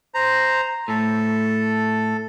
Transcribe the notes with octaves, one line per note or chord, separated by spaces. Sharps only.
C5 A#5
A2 A4